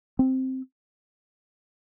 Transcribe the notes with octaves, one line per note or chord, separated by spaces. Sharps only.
C4